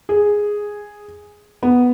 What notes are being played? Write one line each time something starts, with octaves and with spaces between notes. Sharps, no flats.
G#4
B3